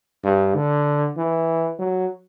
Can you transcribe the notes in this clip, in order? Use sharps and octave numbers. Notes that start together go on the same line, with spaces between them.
G2
D3
E3
F#3